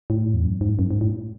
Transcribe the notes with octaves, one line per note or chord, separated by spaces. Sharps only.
A2
E2
F#2
G#2
F#2
G#2
A2